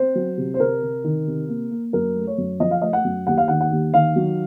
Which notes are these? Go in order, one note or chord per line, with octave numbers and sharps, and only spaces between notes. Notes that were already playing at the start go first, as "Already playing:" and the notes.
Already playing: C4 C5
F#3
C3
C5
C3 A#4
C3
D#3
C3
A#3
A#3
F#2 A#4
A3
C#5
F#2
F3 D#5
F5
A3 D#5
F#5
F#2
D#2 F#5
F5
D#3 F#5
F#5
D#2
D#3 F5
F#3